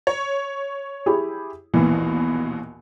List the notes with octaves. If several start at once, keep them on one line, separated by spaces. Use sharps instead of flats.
C#5
E4 G4 G#4
A#1 D#2 B2 E3